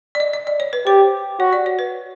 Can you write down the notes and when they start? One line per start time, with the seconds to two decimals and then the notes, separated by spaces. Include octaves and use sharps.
0.15 D5
0.20 D#5
0.33 D#5
0.47 D5
0.60 C#5
0.73 B4
0.86 G4 C5
1.39 F#4 C#5
1.53 D5
1.66 C#5
1.79 B4